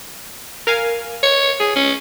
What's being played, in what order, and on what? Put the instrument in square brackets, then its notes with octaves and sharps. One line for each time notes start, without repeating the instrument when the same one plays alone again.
[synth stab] A#4 F5 G#5
[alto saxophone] C#5 [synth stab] C#7
[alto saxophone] G#4
C#4